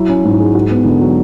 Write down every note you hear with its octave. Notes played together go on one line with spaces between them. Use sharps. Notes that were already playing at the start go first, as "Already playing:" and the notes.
Already playing: F#3 E4
C#4
G#2
G#3
F#4
B3
D3
F#3